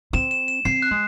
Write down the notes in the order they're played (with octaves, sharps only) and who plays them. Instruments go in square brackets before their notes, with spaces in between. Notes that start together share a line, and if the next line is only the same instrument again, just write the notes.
[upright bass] C4 [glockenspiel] E7
[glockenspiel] E7
E7
[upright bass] C4 [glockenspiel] C7
[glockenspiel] F#6
[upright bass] G#3